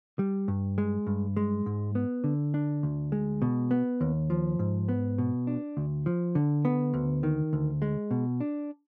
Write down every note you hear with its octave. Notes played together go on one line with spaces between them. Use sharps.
G3
G2
G#3
G2
G#3
G#2
B3
D3
D4
D2
G#3
B2
B3
D#2
F3
G#2
B3
B2
D4
D2
F3
D3
B3
D2
D#3
D2
G#3
B2
D4